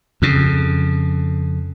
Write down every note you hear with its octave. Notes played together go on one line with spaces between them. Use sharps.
F2 C#3